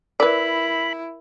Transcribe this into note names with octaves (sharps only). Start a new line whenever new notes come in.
E4 A#4 B4 D5 B5